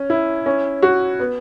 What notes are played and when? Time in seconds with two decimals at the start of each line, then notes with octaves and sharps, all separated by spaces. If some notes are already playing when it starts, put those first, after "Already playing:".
Already playing: C#4
0.10 E4
0.46 C#4
0.83 F#4
1.20 B3